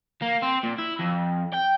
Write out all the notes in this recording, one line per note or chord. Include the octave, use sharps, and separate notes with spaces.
A#3
C4
A#2
E4
F2
G5